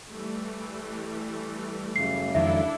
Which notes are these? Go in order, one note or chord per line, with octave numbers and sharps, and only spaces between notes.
E3 G3 A3
F#2 C#3 C7
F2 D#3 G#3 D4 E4 A4 E5